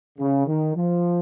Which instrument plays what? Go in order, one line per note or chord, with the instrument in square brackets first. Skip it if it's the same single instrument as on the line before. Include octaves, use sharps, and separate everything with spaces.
[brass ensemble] C#3
D#3
F3